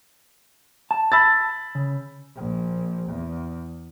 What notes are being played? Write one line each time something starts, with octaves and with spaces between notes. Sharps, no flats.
A5
B5 E6 A6
C#3
A#1
E2